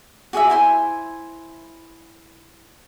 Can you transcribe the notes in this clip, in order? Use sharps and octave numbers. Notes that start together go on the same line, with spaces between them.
F#4 G#4 D5 E5
E4 C5 G#5